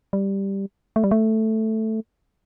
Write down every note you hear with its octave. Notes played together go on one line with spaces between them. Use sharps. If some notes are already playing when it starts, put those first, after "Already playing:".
G3
A3
G3
A3